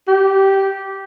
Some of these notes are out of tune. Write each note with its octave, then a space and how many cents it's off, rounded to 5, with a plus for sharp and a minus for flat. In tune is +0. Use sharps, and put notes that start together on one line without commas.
G4 -15